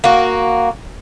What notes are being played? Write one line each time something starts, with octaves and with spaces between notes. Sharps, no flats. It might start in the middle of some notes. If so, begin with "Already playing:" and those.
A#3 F#4